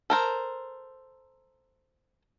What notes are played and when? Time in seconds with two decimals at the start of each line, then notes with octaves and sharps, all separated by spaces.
0.10 A4 A#4 C5